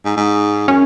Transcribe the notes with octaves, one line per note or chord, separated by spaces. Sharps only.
G#2
G#2
F#2 C#4